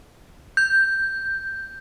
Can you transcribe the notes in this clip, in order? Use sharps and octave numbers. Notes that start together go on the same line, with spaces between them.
G6